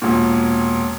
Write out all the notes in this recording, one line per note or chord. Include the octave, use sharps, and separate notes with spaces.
E1 A#2